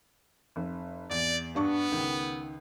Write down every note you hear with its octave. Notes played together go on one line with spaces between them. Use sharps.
F1
E2 D5
G2 B3 D4 C#6
C#2 D#3